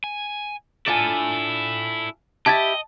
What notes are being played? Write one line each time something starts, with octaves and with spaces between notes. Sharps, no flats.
G#5
D4 E4 F4 A4 G#5
E4 G4 D#5 A5 G#6 A6